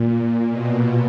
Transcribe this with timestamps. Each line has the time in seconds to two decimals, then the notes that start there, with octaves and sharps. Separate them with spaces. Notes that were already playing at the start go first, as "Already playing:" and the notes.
Already playing: A#2
0.51 B2